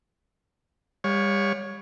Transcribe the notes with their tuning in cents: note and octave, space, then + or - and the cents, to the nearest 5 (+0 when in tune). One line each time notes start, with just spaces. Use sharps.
G3 +35 C#5 +0 F5 +35